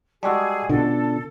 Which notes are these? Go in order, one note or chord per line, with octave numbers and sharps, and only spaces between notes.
G3 G#3 F#4 G#4 A5 D6 E6
B2 D3 C#4 F4 A4